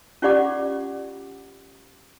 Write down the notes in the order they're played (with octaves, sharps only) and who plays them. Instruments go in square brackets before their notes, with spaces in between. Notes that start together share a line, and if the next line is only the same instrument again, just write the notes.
[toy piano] C#4 F4 G4 D5 F#5 D6